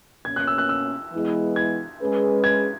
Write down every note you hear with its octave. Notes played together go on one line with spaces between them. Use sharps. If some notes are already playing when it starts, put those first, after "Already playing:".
B2 A#3 C#4 G#6
F#6
E6
F#6
E6
E3 G#3 B3 E4 G#4
G#6
G#3 C#4 G#4 B4
G#6